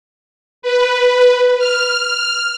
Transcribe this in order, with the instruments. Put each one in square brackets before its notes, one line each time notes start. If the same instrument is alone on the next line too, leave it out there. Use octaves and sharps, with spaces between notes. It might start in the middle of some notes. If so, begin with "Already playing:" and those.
[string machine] B4
F6